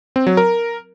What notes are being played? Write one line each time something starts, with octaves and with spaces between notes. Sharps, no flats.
C4
F#3
A#4